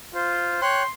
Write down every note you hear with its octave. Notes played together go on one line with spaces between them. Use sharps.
F4 C5
C#5 G5 C6 F#6